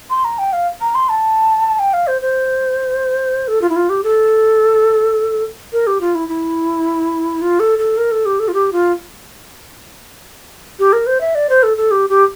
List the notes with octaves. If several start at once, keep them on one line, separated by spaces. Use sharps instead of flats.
C6
A#5
G5
F5
A#5
C6
A5
G5
F5
C5
C5
A4
F4
E4
F4
G4
A4
A#4
G4
F4
E4
E4
F4
A4
A4
A#4
A4
G4
A4
F4
G4
F4
G4
A#4
C5
E5
D5
C5
A4
A4
G4
G4